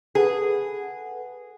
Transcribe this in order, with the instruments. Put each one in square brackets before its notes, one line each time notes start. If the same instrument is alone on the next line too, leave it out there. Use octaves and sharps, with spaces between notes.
[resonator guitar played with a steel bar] G#4 [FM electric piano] A4 B4 F#5